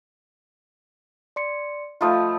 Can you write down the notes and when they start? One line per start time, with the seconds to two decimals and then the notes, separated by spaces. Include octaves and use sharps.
1.36 D5 C6 C#7
2.01 F3 A3 F4 D#5 B5 D#6